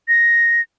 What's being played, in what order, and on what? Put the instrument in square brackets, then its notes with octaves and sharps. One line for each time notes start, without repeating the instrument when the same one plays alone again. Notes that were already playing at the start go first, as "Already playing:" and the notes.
[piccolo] A#6